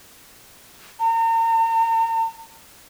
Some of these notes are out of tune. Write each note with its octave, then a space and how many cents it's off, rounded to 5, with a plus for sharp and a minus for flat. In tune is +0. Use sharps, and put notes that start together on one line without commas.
A#5 -40